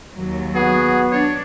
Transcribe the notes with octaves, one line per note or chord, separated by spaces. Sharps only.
D#2 F#3
B3 F#4 G#4
D4 C#5